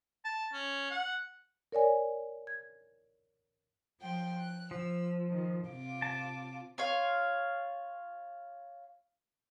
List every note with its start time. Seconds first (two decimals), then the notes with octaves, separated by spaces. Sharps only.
0.24 A5
0.53 C#4
0.90 F#5
1.72 A#4 C#5 D5 G#5
2.47 G#6
4.00 F3 G5 C6
4.38 F#6
4.71 F3 E6
5.29 D#3
5.68 C3 F4 D6
6.02 A5
6.78 F4 C#5 F5